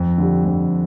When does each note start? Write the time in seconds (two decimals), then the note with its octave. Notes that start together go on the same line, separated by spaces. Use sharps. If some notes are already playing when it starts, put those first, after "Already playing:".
Already playing: F2
0.18 D3 G3
0.45 F2